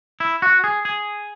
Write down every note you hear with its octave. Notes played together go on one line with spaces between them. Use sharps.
E4
F#4
G#4
G#4